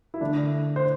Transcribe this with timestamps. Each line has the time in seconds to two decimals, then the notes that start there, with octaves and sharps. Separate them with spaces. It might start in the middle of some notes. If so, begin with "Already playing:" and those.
0.14 E4
0.21 D3 A3 D4
0.76 C5